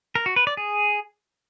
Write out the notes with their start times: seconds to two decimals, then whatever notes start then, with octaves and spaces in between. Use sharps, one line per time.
0.15 A#4
0.26 F#4
0.36 B4
0.47 D5
0.57 G#4